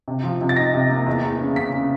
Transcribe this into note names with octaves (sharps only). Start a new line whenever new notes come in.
C3
F3
C3
A6
D#4 A#6
C3
A#3
E2
E2
C#3
C#3 B6
C#3